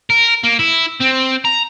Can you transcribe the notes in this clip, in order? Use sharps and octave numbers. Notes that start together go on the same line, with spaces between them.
A#4
A#3
E4
C4
A#5